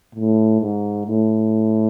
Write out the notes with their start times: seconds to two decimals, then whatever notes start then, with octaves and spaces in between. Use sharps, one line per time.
0.15 A2
0.61 G#2
1.07 A2